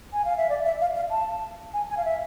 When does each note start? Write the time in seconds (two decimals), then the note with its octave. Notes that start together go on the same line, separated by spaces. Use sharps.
0.13 G#5
0.25 F5
0.37 E5
0.49 D5
0.65 E5
0.81 F5
0.95 F5
1.11 A5
1.74 G#5
1.90 G#5
1.97 F5
2.05 E5